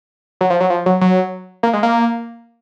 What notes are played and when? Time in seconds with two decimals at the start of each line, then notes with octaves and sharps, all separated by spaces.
0.41 F#3
0.50 F3
0.60 F#3
0.70 F3
0.86 F#3
1.01 F#3
1.63 A#3
1.73 G#3
1.83 A#3